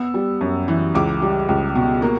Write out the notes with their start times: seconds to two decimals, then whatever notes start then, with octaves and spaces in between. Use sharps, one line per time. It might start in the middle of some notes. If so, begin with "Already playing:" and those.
Already playing: B3 E6
0.14 G3
0.41 F#2
0.68 E3
0.95 C#2 D6
1.22 G3
1.49 C#2
1.75 B2
2.02 A#3